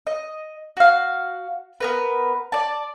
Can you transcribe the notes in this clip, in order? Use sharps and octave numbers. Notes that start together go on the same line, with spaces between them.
D#5
F#4 F5
B3 A#4 B4
D5 A5